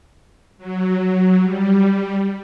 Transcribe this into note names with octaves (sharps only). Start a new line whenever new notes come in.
F#3
G3